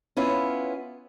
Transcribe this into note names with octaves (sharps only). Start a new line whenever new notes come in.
B3 C#4 E4 F4